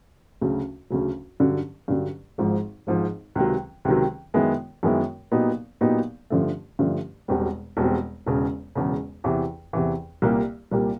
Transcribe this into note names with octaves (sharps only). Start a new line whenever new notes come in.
D2 C#3 F#3
D2 C#3 F#3
G2 D3 F#3
G2 D3 F#3
G#1 G#2 F3
G#1 G#2 F3
C#2 C3 D#3 F#3
C#2 C3 D#3 F#3
F#2 D#3 G#3 B3 E4
F#2 D#3 G#3 B3 E4
A#2 F#3 B3 D#4 G4
A#2 F#3 B3 D#4 G4
G2 D3 F3 A3
G2 D3 F3 A3
E1 E2 B2 G3 C4
E1 E2 B2 G3 C4
E1 E2 C#3
E1 E2 C#3
E2 C3 E3
E2 C3 E3
C2 A#2 G3 A#3
C2 A#2 G3 A#3